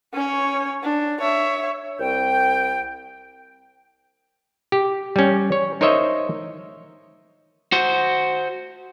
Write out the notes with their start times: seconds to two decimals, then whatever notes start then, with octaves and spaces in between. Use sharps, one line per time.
0.14 C#4 C#5
0.83 D4
1.21 C#5 E5
2.00 C2 G5
4.72 G4
5.16 G3 C#4
5.52 C#5
5.81 D#4 A#4 C5 C#5 D#5 E5
7.72 F#4 C5